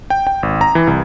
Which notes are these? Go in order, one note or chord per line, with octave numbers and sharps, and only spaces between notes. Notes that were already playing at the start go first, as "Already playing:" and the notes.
G5
G5
G#1
A#5
E3
C2